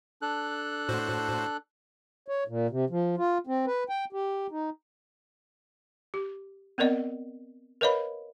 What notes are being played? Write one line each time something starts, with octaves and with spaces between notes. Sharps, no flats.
D4 A4 F#6
A2 F#4 C5
C#5
A#2
C3
F3
F4
C4
B4
G5
G4
D#4
G4
B3 C4 A#4 D5 D#5
A#4 B4 C#5 D#5 F5 B5